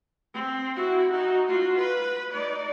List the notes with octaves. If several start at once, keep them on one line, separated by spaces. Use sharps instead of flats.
C4
E4 F#4
D#4 F#4
F4 F#4
B4
D#4 D5